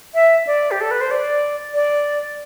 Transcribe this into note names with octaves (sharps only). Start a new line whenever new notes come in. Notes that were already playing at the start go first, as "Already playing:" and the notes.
E5
D5
G4
A4
B4
C5
D5
D5